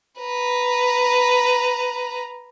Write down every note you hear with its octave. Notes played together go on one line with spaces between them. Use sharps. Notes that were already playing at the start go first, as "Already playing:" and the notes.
B4 A#5